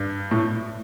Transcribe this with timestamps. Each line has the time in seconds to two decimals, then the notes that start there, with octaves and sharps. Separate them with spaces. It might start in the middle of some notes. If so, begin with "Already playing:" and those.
Already playing: G2
0.31 A2